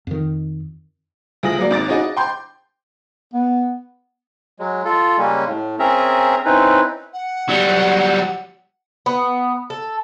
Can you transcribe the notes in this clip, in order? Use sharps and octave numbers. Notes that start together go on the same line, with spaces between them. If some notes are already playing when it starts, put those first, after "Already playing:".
F2 D#3
D2 G#3 F4 D#6 A#6 F#7
F#3 G#3 A#3 D5
G#1 D6 A6 D7
C#4 D#4 F#4 G#4 D#5
D#5
G5 C6 G6
B3
F#3 G#3
F4 A4
C#3 G3 G#3 A#3 C#4
A2
C4 C#4 G#4 A#4 E5 A#5
C4 C#4 D#4 E4 B4
F#5
F#3 G3
B3
A4